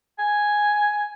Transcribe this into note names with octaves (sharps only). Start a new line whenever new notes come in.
G#5